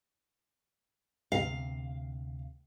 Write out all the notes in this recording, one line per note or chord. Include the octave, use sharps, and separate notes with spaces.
D2 C3 F5